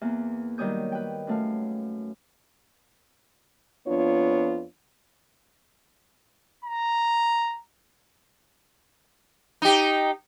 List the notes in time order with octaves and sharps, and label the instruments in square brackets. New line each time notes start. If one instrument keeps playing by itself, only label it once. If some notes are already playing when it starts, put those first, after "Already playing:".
[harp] E2 A#3
D#3 F#3 G3 C#5 D#6 G6
B4 G5
F#2 A3 F5
[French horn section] F2 B3 D4 F4 C#5
[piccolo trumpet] A#5
[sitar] D#4 G4